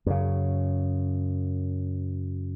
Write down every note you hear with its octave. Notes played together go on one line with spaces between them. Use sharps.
F#2 C#3